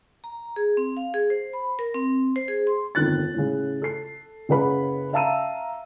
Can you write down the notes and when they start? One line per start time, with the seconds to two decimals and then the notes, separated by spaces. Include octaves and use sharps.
0.24 A#5
0.56 G#4
0.77 C4
0.97 F5
1.14 G#4
1.30 C5
1.53 B5
1.79 A#4
1.95 C4
2.36 C5
2.48 G#4
2.67 C6
2.95 G1 F2 D#3 F#6 A6
3.34 A2 C#3
3.82 A4 C7
4.49 F#1 C#3 B4 F#5 B5
5.13 E5 F5 A5 A#5 E6 D#7